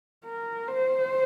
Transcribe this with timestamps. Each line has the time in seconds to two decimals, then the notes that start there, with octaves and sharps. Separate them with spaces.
0.25 A#4
0.68 C5